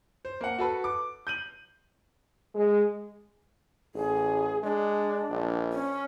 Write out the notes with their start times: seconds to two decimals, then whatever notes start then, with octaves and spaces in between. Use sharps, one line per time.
0.25 C5
0.41 A#3 F#5
0.58 F#4 A4 B4
0.84 D6
1.27 G6 D#7 F#7
2.55 G#3
3.95 A1 G#4
4.63 G#3 D4
5.30 A#1
5.73 C#4